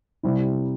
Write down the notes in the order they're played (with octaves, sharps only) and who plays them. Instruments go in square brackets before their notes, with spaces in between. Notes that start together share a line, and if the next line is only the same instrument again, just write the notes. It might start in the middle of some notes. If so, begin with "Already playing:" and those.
[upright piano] C3 G3 C4 E4